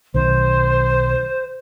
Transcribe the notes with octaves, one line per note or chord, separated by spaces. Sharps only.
B1 D#3 C5